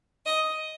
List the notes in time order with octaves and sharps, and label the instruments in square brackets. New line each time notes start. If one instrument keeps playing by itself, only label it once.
[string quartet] D#5